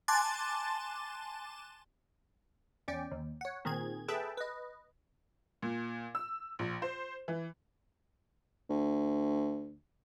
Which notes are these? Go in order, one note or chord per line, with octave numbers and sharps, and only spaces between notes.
G#5 A5 C6 D6 F#6 A6
E2 C#4 D5 G5
D#2
C#5 F#5
A#2 D#3 C4 G#4 G#6
G#4 A4 B4 E5 G5 A5
B4 D#5
A#2
E6
A#1
C5
E3
D2